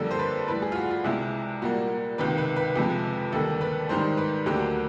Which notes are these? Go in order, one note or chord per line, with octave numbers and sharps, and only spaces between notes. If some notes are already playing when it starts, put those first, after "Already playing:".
Already playing: F2 D3 G3 A#3 A4
C5
B4
A2 E3 G3 B4
G#4
F4
F#4
F4
C2 C3 E3 G#3 E4
A#2 G3 A#3 F#4
C#2 C3 D#3 B4
B4
B4
F2 C3 F3 G#3
D#2 D3 G3 A#3 A4
B4
G#2 D#3 G3 C5
B4
D2 D3 F#3 A#3 G4